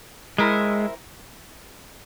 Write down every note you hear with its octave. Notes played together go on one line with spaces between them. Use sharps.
G#3 C4 E4 A#4